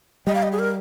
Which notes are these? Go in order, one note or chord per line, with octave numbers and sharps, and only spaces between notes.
G3 D#5
F5
D#5
G#4
A#4